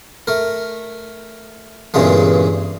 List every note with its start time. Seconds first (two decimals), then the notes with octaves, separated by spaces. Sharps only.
0.27 A3 A#4
1.94 E2 G2 A#2 C#3 G#3 A3